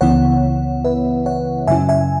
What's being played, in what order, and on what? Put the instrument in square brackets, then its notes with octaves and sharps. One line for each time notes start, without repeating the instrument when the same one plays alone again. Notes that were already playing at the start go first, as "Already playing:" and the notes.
[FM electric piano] C#2 C#3 E3 B3 E4 C#5 F#5
B4 E5
C#5 F#5
F#2 C#3 F#3 C#4 E4 E5 G#5
E5 G#5